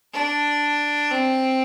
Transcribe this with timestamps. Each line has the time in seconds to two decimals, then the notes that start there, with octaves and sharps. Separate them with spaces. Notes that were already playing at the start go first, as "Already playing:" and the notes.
0.13 D4
1.10 C4